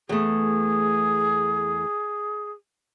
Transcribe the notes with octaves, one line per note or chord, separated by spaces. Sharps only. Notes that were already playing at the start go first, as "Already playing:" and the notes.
E2 A3 G#4